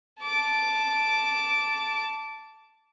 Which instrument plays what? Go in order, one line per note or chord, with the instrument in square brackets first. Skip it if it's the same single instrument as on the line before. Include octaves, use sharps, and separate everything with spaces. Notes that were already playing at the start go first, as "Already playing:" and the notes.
[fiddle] A5 D6